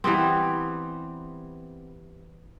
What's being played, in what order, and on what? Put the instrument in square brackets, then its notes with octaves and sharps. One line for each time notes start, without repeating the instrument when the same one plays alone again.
[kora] E3 G3 B3 C4